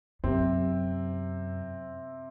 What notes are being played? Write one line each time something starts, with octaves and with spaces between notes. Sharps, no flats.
F#2 C3 C4